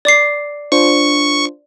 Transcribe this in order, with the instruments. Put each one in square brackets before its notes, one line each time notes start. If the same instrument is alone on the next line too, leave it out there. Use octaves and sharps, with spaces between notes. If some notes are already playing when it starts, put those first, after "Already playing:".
[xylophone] D5 D6 C7
[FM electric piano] D4 F4 C5 [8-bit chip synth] C#6